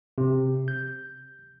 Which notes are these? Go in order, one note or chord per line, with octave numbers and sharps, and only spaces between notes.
C3
G6